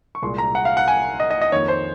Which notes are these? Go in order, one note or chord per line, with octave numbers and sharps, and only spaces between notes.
C#6
C2 A#2 G#3 C6
A#5
F#5
F5
F#5
G#5
D#5
D#5
D#5
F2 D#3 A#3 C#5
C5